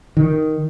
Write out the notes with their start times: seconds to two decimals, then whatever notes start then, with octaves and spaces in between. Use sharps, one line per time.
0.17 D#3